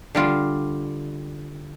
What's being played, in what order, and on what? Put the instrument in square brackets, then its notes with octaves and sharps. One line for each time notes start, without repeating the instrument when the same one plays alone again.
[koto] D3 G3 F4